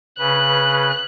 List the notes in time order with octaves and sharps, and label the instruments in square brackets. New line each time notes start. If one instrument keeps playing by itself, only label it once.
[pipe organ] C#3 B4 [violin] F#6